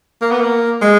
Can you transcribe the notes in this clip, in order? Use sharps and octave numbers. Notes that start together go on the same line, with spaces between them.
A#3
B3
A#3
G#3